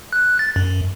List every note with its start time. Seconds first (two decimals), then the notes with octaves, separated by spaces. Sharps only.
0.13 F#6
0.39 A6
0.56 F#2